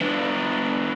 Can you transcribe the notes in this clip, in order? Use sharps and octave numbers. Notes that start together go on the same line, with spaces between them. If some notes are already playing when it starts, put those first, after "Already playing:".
B3 D4